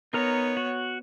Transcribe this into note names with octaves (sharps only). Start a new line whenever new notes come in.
B3 D#4 A#4 C#5 A#5
F#4